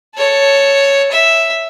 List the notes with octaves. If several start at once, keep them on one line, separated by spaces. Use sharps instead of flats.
A4 C#5
E5